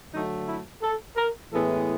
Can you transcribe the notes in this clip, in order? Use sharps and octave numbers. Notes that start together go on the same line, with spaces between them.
D3 F#3 A3 D#4
E4
A4
A#4
A2 E3 G#3 B3 A4